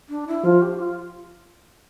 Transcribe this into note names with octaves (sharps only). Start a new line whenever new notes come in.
D4
E4
F3 F4
G4
F4